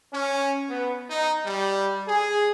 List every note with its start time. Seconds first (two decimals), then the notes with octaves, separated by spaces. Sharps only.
0.13 C#4
0.70 B3
1.10 D#4
1.46 G3
2.08 G#4